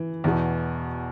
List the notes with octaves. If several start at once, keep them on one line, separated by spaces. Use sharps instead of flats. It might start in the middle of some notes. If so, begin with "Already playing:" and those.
Already playing: E3
E2 B2